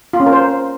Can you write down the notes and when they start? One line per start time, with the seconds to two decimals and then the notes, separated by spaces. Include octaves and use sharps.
0.13 F4
0.20 C#4
0.26 A#4
0.33 C5